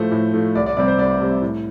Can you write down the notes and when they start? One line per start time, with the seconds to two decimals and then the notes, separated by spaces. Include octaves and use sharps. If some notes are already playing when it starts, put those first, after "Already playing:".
Already playing: A2 F3 A3 C5
0.11 A2
0.34 F3 A3
0.55 C2 D5
0.66 D5
0.77 C3 G3 C4 D5
0.88 C5
0.98 C2 D5
1.20 C3 G3 C4
1.42 A2